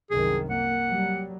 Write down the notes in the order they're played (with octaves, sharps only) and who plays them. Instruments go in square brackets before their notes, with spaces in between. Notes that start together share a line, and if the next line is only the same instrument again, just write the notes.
[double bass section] C2 F#2 D#3 [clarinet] G#4
[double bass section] A#3 [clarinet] F#5
[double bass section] F#3 G3